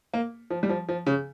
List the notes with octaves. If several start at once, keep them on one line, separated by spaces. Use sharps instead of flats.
A#3
F3
G3
F3
F3
C#3